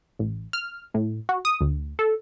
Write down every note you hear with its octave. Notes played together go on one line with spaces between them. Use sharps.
A1
F6
A2
F#4
D#6
D2
A4